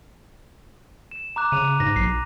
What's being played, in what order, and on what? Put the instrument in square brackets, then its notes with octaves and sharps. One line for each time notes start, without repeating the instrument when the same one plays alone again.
[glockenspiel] E7
A#5 D6 F#6
[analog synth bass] C#3 [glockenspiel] D#7 F7
[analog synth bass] G#2 [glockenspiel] A#6
[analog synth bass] B1 [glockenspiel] C7